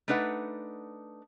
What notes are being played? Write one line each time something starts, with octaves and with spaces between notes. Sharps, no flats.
A3 D4 D#4 B4 F#5